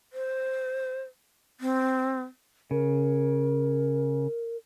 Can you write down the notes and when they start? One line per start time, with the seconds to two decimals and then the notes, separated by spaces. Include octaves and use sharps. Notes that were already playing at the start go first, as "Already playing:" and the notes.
0.13 C5
1.61 C4
2.71 C#3 A#4